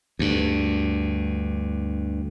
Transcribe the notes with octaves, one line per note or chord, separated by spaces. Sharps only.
D2 G2